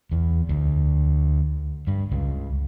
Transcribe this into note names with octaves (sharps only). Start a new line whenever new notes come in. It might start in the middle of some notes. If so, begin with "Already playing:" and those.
E2
D2
G2
C#2